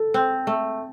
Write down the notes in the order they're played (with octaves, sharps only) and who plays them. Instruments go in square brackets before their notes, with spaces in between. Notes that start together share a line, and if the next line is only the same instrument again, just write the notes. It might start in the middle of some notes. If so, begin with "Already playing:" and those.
Already playing: [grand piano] A4
[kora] C4
A3